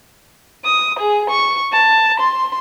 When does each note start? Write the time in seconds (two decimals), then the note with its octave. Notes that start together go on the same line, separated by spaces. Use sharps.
0.64 D#6
0.99 G#4
1.29 C#6
1.72 A5
2.20 C6